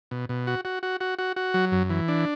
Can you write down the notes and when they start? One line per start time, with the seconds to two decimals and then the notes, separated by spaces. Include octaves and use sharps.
0.11 B2
0.29 B2
0.47 F#4
0.65 F#4
0.83 F#4
1.01 F#4
1.19 F#4
1.36 F#4
1.54 F#3
1.72 F#2
1.90 E3
2.08 D4